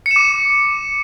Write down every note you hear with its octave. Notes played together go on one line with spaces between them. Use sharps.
C#7
E7
D6